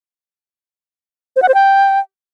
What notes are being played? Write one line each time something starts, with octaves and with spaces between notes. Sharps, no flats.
C5
F#5
C5
G5